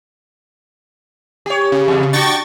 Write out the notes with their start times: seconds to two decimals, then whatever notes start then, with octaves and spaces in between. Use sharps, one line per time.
1.46 G4 C#5
1.72 C#3
1.88 E2
2.13 D4 F#4 G5 C#6 A6